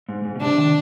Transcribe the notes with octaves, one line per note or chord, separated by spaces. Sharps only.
G#2
G#2
B2
C3 D4
D#3